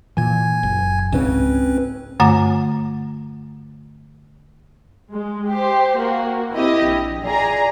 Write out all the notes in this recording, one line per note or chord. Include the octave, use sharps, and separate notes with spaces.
A#2 E3 G#5 G#6
F#1
C#2 G#2 C#3 C4 C#4 B4
G2 D3 A3 F#5 A#5 D6
G#3
G4 C5
A#3 F#4
C4 E4 G4 D#5
A#1
F4 G#4 D5 A#5